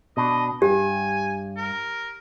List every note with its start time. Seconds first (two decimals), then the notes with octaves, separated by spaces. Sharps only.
0.17 B2 D4 D#5
0.62 G2 G4 G#5
1.57 A#4